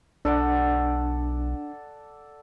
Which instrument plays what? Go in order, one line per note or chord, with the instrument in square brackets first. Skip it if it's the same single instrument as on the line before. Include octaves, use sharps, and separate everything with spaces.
[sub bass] B1 [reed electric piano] D4 [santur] A4 D5 F#5